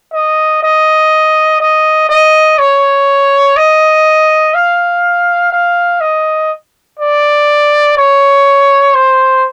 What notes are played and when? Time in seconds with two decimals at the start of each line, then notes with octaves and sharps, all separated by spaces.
0.13 D#5
0.63 D#5
1.60 D#5
2.09 D#5
2.59 C#5
3.57 D#5
4.55 F5
5.52 F5
6.01 D#5
6.99 D5
7.97 C#5
8.95 C5